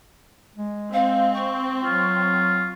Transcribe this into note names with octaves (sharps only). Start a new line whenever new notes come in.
G#3
C4 F5
C#6
F#3 F4